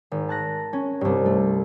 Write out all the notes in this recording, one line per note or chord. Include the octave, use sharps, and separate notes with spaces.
G#1
A5 F#6 A#6
C#4
C2 G2
A3